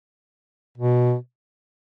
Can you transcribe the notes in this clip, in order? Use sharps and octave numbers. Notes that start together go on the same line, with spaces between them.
B2